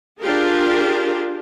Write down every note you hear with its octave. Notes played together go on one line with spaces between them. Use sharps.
D4 F4 G4 G#4 A#4